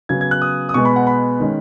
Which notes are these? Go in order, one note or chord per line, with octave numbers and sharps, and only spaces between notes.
C#3 F#3 B3 G#6
G#6
F#6
D#6
D#6
B2 G#3 B3 C#6
B5
F#5
B5
D#3 G#3 C#4